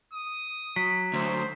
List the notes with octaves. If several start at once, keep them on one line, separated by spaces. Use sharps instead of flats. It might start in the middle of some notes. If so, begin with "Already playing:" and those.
D#6
F#3 B6
D2 C5